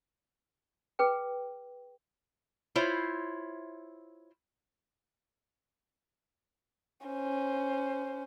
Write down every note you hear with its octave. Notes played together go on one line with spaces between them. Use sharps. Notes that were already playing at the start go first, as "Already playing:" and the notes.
G#4 B4 G5
E4 F4 C5 C#5 E5
C#4 C5